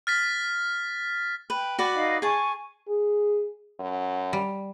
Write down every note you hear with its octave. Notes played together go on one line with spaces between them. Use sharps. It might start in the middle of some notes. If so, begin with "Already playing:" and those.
F6 A6 B6
B4 G5
F#4 B4 D5
D#4 D#5 F5
G#4 G#5 A5 C#6
G#4
F#2
G3